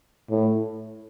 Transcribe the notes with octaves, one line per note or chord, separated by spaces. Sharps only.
A2